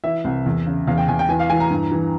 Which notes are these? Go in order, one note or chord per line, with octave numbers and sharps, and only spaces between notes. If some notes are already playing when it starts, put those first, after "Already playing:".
E3 E5
C2
E2
C#3
E2 F5
G5
E2 G#5
G5
E3 G#5
F5
E3 G#5
A#5
G2
E3